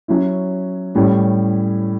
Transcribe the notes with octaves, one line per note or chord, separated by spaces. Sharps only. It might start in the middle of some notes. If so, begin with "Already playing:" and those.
F#3 C#4 E4
A2 G3 C#4